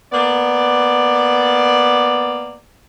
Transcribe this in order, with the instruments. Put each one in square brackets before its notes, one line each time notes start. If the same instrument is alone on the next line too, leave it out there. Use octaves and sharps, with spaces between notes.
[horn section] A#3 B3 D5